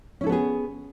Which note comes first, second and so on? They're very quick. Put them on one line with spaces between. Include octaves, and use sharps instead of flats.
C#4 E4 A4 B3 G#4